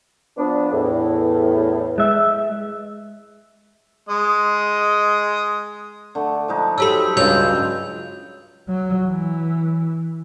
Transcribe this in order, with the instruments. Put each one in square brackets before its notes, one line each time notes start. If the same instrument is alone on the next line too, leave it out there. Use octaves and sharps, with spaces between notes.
[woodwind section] F3 B3 D4
E2 A2
[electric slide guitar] G#3 E5
[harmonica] G#3 D#5
[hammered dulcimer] D3 A3
F3 G#3 D#4
[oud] F#3 G4 A4 [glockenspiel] B5 E6
[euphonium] C#2 [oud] G2 F#3 [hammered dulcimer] F4 [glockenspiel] E6 G6 F7
[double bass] F#3
E3